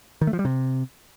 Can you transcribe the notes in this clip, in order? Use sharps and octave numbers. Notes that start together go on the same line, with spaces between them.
D#3
A3
F3
G3
C3